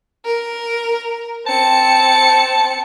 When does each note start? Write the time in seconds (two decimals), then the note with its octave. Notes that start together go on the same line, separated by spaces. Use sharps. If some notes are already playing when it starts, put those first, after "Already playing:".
0.25 A#4
1.46 C4 A5 C#7